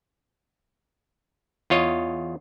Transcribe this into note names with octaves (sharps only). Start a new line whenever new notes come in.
E2 F4 C#5 D#5